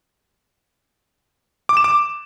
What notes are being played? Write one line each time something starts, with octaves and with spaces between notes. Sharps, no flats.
D6
E7
D6